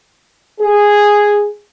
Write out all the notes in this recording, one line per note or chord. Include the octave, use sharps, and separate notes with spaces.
G#4